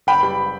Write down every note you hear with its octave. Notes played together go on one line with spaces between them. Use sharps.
F#1 G5 B5
G3